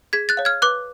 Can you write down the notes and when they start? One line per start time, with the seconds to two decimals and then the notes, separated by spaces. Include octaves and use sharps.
0.13 G#4 G#6 B6
0.29 F#6 A6
0.37 C#5 F5
0.45 F6 G#6
0.62 B4 D6 F#6